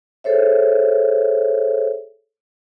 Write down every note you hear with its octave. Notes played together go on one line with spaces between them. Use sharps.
G#4 A4 C5 C#5 E5